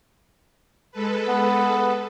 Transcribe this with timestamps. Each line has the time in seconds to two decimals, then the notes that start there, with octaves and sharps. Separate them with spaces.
0.91 G#3 A4 B4
1.27 B3